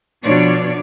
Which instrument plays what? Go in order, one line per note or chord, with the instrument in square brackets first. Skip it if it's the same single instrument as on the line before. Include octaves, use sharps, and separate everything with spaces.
[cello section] B2 F3 B3 D4 C#5 D5